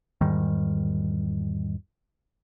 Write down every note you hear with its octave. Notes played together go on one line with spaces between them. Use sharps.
E2 G#2 D#3 G3